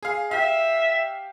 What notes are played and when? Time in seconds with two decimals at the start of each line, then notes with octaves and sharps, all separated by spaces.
0.03 G#4 F5
0.31 G4 E5 F5